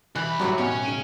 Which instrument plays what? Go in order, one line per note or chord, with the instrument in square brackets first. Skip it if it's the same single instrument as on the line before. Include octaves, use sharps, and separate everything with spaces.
[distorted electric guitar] C2 B5 [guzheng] E3 [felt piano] F#6
[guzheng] F#2 A2 F#4 [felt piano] F#3 G3
[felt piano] B2 [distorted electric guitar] C#4 [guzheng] G5
[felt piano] C#3 D7 D#7